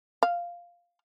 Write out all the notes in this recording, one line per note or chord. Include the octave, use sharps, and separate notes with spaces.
F5